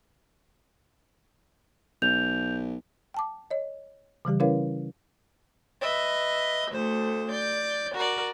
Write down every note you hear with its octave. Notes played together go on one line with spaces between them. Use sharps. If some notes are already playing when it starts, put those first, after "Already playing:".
B1 G6 F7
G5 A5 D6
C#5 D#5
C#3 E3 G3 G4
C#4 E4 A#4 B4 C#5 F5
B4 D#5 E5
D2 A3 C5
D5 G6
F#4 A#4 D5